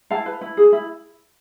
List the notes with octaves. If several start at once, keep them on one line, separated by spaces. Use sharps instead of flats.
E4 F5 A5
B4
E4
G#4
E4